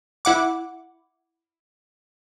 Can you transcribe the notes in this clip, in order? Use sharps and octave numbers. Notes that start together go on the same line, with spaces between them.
E4 F#5 D6